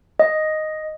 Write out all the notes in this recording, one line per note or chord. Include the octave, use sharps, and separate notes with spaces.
D#5